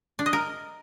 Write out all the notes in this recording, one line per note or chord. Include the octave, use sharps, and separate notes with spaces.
D4
D#5
A#4